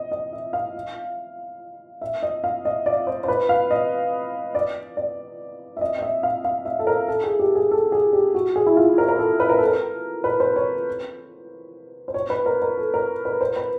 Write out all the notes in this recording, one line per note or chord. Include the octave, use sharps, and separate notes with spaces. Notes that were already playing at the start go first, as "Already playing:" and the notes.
Already playing: D#5
D#5
E5
F5
E5
D#5
F5
D#5
D5
C5
C5
B4
F5
D#5
D5
D5
E5
D#5
D#5
E5
F5
F5
E5
A4
A#4
A4
G#4
G4
G#4
A4
G#4
G4
F#4
G#4
E4
F4
A#4
A#4
A4
B4
A#4
A4
A#4
B4
C5
C#5
C5
C#5
B4
A#4
A#4
A4
A#4
B4
C5
B4